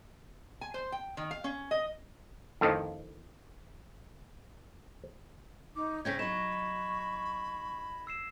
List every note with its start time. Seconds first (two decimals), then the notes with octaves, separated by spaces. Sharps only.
0.61 G#5
0.74 C5
0.92 G5
1.17 D#3
1.31 F5
1.44 C#4
1.71 D#5
2.61 F2 A2 D3 D#3 F3
5.76 D#4 D6
6.05 C#3 C4 C#4 C#5 G6 G#6 A#6 B6
6.19 F#3 D#4 B5 C#6 E7
8.07 E6 C7 E7